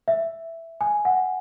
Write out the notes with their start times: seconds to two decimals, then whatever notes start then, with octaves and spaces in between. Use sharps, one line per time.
0.08 E5
0.81 G#5
1.05 F#5